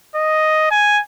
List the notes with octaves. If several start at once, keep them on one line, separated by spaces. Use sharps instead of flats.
D#5
G#5